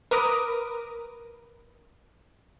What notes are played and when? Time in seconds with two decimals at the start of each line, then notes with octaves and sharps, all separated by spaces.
0.11 A#4 B4 D6 D#6